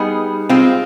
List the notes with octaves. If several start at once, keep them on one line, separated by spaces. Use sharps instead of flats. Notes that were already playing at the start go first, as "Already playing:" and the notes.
Already playing: G3 B3 D#4 G#4
G#3 C4 F4